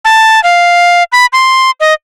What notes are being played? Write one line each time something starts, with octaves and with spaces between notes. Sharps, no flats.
A5
F5
B5
C6
D#5